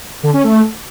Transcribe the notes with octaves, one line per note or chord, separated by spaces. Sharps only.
D3
C#4
A3